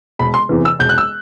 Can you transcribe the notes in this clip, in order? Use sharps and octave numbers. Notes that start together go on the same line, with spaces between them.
E1 B5
C6
E2 C3 E3
E6
E1 G6
F#6
E6